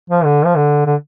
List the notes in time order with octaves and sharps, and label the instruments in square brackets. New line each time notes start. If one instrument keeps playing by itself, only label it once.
[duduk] F3
D3
F3
D3
D3